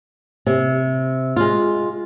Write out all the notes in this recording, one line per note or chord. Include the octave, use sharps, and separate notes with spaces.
C3
G#3 F4